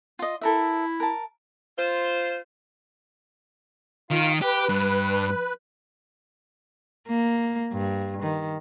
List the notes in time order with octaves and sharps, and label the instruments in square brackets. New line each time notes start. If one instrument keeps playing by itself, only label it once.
[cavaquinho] F4 D#5
[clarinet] E4 [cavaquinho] A4 A#4 E5
[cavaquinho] A#4 A5
[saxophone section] F4 C5
[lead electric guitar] D#3 [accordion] F4 F5
[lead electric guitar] G4 [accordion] B4
[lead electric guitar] G2
[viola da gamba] A#3
G2
D#3